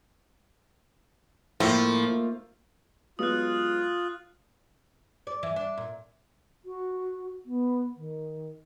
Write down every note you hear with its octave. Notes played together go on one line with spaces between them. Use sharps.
A2 F3 A#3 D#4 F4
F#3 G#3 B3 F4 D#6 F#6
D5
E3
D4
A#2
F#4
B3
D#3